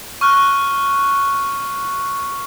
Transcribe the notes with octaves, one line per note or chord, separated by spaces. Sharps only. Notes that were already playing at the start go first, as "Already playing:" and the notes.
C#6 F6 F#6